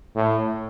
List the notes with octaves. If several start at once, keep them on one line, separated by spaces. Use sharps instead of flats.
A2